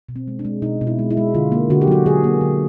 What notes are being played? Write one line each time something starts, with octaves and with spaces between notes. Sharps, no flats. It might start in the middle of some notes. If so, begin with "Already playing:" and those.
B2
C4
G#3
D4
G#3
B2 D#4
B2
E4
G#3
E4
G#3
D3 F4
A#3
D3 F#4
G4
F#3 F#4
D3 G#4
A#3
D3